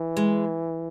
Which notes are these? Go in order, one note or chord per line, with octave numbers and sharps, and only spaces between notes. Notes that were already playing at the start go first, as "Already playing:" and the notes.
Already playing: E3
G#3